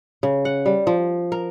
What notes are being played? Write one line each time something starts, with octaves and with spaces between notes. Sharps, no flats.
C#3
F#5
G3
F3
A#4